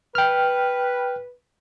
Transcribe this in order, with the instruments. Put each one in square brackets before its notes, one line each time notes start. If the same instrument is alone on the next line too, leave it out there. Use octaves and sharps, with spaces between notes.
[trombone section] B4 [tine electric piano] G5 F6